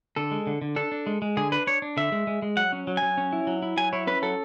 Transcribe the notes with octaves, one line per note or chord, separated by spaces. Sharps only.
D3 A4
G#3
D3
D3
D4 A4
D4
G#3
G#3
D3 G#4
D4 B4
D4 C#5
D4
D3 E5
G#3
G#3
G#3
F#3 F#5
C#4
F#3
G#5
F#3
C#4
E4
F#3
E4
F#3 G#5
E4 C#5
C#4 B4
F#3 A4